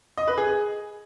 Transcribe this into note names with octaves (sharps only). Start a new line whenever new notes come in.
D#5
B4
G#4